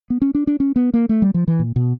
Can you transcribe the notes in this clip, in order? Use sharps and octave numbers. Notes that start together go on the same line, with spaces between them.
B3
C#4
D4
D4
C#4
B3
A#3
A3
G3
F3
E3
A#2
B2